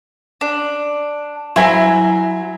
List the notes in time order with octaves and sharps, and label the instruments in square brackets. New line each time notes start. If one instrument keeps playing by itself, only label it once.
[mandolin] D4
[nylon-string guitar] F#3 C5 E5 [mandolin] E4 G#5 A#5